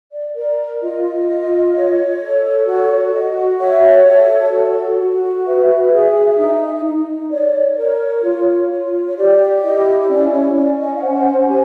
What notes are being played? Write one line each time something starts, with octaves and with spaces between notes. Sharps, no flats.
D5
A#4 D5
F4 D#5
F4
C#5
A4
F#4 C#5
F#4 D#5
C#5 E5
A4 E5
F#4
F#4
B4 E5
G#4
D#4
D#4
C#5 D5
A#4 C#5
F4
F4
C#5
G4 D5
E4 D#5
C#5
C#4 D5
C#5
C#4 D5
D#5
F5
C5 F#5
G4 G#5